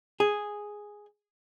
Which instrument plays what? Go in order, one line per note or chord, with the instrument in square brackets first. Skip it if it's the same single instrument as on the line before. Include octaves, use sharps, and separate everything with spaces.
[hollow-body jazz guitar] G#4